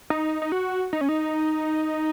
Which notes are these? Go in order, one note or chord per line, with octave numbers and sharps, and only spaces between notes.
D#4
D#4
F#4
D#4
C#4
D#4